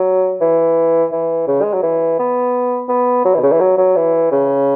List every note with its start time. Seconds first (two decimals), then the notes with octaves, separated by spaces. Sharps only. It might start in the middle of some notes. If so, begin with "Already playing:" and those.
Already playing: F#3
0.41 E3
1.11 E3
1.47 C#3
1.62 G#3
1.73 F#3
1.83 E3
2.19 B3
2.89 B3
3.25 F#3
3.34 E3
3.39 B2
3.43 C#3
3.52 E3
3.60 F#3
3.77 F#3
3.96 E3
4.32 C#3